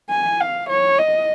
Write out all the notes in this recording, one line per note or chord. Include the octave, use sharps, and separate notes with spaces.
G#5
F5
C#5
D#5